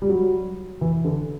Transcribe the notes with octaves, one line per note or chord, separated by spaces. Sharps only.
G3
F#3
E3
D3